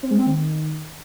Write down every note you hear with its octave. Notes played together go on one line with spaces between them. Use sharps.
C4
G#3
C4
D#3